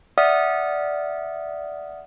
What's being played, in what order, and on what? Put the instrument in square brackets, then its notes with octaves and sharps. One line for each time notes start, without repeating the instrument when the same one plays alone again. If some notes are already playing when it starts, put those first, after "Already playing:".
[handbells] D5 E5 F#5 D#6 F6